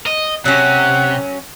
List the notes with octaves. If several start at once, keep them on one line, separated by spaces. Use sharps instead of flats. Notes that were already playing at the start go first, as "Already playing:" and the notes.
D#5
C3 F#3 C#4 F#5